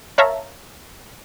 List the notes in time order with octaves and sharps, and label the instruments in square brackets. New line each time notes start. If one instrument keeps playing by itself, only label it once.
[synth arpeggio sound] A#4 C#5 E5 F5 A5 A#5